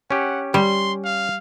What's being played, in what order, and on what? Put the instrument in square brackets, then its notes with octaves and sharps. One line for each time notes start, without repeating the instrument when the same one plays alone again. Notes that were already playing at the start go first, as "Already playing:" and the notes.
[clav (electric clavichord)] C#4 G4 [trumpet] F#5
[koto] G3 [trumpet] C6
[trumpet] F5